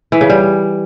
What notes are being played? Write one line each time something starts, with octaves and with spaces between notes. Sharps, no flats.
E3
C#3
G3